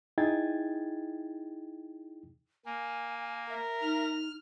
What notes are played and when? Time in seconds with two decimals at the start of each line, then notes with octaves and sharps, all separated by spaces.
0.18 D#4 E4 G#4 G5 G#6 A6
2.65 A#3 G#5
3.49 A#4 E5
3.82 D#4 F6